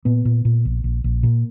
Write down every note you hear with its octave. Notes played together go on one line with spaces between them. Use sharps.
A#2 B3
A#2
A#2
A#1
A#1
A#1
A#2 A#3